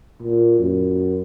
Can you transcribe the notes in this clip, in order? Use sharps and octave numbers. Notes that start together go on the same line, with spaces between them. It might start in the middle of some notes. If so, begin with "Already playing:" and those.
A#2
F#2